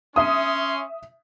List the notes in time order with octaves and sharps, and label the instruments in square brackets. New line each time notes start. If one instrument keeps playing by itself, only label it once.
[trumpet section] C#4 C6 [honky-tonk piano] E5 D#6